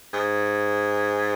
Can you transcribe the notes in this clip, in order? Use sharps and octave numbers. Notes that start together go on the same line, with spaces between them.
G#2